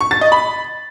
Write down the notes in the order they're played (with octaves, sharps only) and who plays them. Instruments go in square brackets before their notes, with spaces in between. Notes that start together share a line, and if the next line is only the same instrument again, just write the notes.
[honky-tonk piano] C#6
A6
D#5
B5